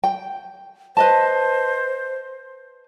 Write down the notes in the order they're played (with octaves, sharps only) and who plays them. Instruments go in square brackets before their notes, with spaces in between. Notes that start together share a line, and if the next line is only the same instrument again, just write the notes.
[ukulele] G5
[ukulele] B4 D#5 A5 [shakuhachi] C5